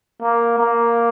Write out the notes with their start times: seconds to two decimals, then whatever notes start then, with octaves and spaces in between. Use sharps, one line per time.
0.22 A#3
0.58 A#3